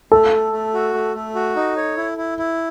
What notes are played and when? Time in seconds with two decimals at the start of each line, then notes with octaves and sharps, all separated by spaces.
0.12 A3 A4
0.33 A3
0.53 A3
0.74 F#4
0.94 A3
1.15 A3
1.35 F#4
1.56 D#4
1.77 C#5
1.97 E4
2.18 E4
2.38 E4